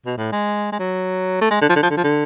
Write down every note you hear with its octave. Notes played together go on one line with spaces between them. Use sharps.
B2
A2
G#3
G#3
F#3
A3
G#3
D3
F3
D3
F3
D3
F3
D3